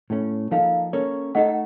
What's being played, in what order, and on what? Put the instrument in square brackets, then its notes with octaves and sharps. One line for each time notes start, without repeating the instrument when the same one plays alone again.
[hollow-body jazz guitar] A2 A3 C#4
[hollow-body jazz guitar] F3 A#3 D#4 A4 [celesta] F5
[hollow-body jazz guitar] A#3 C#4 A4 C#5
[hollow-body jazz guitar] A3 D#4 A4 [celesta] D#5 F#5
[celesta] F#5